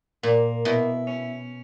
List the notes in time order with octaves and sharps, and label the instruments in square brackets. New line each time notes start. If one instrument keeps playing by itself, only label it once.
[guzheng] A#2 [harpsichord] A#3
[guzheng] B2 [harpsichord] E4
[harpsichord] C#4